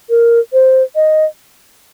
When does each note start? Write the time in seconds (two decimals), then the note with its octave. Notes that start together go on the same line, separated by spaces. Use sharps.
0.10 A#4
0.53 C5
0.96 D#5